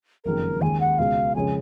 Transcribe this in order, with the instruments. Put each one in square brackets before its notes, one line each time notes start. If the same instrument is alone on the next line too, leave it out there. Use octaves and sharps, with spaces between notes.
[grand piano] F#1 F2 D#3 G#3 [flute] A#4
[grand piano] D#2 D#3 G#3 [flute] G#5
[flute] F#5
[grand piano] C#2 B2 G#3 [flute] F5
[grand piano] F2 C#3 G#3 C#4 [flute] G#5